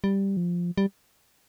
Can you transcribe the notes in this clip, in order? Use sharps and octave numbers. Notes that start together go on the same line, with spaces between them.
G3
F3
G3